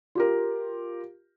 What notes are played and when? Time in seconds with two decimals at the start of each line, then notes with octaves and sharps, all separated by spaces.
0.15 F4 G4 A#4